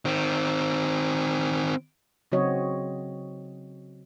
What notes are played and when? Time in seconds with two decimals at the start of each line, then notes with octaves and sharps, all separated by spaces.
0.05 D#3 C4
2.32 C#3 F#3 C4 F#4 C#5 D#5